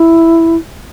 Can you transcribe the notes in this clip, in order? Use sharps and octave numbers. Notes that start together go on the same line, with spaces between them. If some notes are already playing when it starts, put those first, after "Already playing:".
Already playing: E4